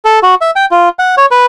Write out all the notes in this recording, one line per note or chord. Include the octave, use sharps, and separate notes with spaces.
A4
F#4
E5
G5
F4
F#5
C#5
B4